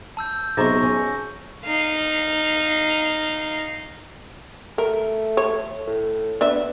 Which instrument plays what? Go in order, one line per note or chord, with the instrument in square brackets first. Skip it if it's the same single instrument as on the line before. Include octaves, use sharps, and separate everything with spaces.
[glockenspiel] A5 E6 G6
[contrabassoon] B1 [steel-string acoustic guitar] C3 [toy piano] G#4 D#5 A#5 [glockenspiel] C#6 A#6
[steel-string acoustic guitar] C#4
[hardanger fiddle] D#4 F5
[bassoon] A3 [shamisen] A#4
[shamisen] C#5
[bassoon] A2
[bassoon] B3 [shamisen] D4 E5